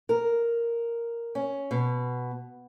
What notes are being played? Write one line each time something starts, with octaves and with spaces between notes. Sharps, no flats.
A#4
C#4
B2